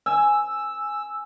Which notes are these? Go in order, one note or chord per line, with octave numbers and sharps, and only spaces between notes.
G#5 E6